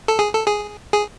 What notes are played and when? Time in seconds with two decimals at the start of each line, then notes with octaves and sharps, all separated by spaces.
0.08 A4
0.19 G#4
0.34 A4
0.47 G#4
0.93 G#4